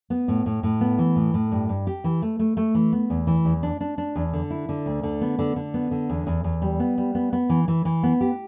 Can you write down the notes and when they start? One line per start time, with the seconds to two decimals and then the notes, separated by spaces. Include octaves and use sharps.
0.10 B3
0.28 A2
0.46 A2
0.63 A2
0.81 B3
0.99 E3
1.16 A2
1.34 A2
1.51 G2
1.69 G2
1.87 G4
2.04 E3
2.22 A3
2.39 A3
2.57 A3
2.75 E3
2.92 B3
3.10 E2
3.27 E3
3.45 E2
3.63 D4
3.80 D4
3.98 D4
4.16 E2
4.33 D3
4.50 E4
4.69 D3
4.86 D2
5.03 D3
5.21 B3
5.39 D3
5.56 D3
5.74 B3
5.91 D3
6.09 E2
6.27 E2
6.44 E2
6.62 G3
6.79 B3
6.98 G3
7.15 B3
7.33 B3
7.49 E3
7.68 E3
7.85 E3
8.03 B3
8.21 G4